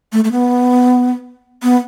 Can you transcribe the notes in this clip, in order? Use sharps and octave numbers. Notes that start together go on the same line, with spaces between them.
A3
A3
B3
B3